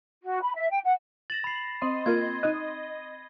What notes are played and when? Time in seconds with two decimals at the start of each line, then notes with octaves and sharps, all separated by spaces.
0.22 F#4
0.43 B5
0.55 E5
0.71 G5
0.84 F#5
1.30 A6 A#6 E7 F#7
1.44 B5 C7
1.82 C4 D#5 C6
2.06 A#3 F4 A#4 G#6
2.43 D#4 D#5 D#6 F#6